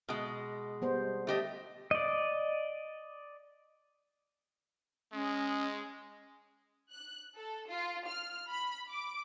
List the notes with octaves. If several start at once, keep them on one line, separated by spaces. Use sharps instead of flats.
B2 G#3
G3 B3 C5
A3 G4 D#5
D5 D#5
G#3 C#4 D#6
F#6
A4
F4
F6
B5
D6